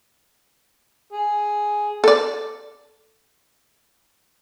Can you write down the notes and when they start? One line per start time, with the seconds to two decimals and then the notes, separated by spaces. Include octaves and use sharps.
1.12 G#4
2.04 A4 D5